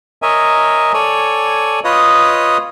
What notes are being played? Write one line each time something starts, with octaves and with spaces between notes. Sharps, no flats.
A#4 C#5 D#5 E5 G#5
A4 C#5 D5 G#5
F4 B4 C#5 D#5 D#6